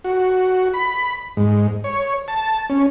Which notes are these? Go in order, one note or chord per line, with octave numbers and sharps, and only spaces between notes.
F#4
B5
G#2
C#5
A5
C#4